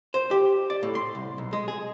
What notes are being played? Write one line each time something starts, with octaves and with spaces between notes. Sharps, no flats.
C5
G4
D5
A2
C6
C2
B1
G#3
G#4